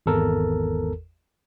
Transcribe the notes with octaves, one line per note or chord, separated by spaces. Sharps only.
G#1 E2 A4 A#4